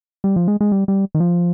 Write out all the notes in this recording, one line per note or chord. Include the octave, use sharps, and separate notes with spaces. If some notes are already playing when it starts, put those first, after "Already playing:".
G3
F3
G#3
G#3
G3
G3
D#3
F3